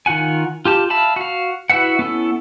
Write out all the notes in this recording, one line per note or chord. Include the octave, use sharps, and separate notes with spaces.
D#3 F4 F#5 G#5
F4 G4 A5
E5 F5 A5 B5
F#4 F5
E4 F#4 B4 E5 F#5
B3 C#4 E4 A4